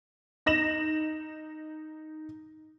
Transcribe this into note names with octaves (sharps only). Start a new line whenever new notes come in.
D#4 A#6 E7 F#7